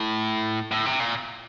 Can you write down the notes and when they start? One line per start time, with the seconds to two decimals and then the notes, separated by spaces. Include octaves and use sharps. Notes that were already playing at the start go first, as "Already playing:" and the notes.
Already playing: A2
0.72 A2
0.86 C3
1.00 A#2